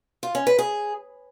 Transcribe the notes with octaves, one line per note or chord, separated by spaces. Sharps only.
F4
C#4
B4
G#4